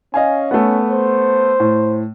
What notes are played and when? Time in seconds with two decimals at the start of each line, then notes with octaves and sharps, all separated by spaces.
0.14 C#4 D#5 F5 G#5
0.51 A3 B3
0.91 C5
1.60 A2